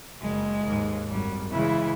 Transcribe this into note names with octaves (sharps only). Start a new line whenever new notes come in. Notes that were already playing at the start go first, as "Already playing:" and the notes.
F#1 G#3
D#2 G#2
G#1 F#2 G3
C#3 E3 G#3 E4